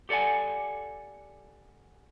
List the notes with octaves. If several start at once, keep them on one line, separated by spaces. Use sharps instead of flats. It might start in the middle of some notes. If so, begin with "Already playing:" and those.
G4 A4 D5 F#5 G#5